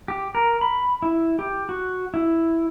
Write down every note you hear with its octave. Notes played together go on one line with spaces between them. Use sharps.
G4
A#4
B5
E4
G4
F#4
E4